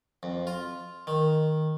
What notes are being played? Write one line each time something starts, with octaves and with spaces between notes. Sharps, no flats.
F2
F4
D#3